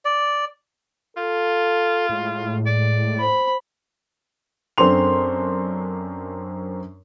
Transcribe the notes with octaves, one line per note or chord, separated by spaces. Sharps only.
D5
F4 A4
A2 G#3
D5
C5 B5
F#2 C4 D4 A4 C6 F7